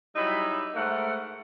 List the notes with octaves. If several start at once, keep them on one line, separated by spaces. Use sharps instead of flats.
F#3 G3 D#4 E4 E5 B5
G#2 A3 A#4 F#5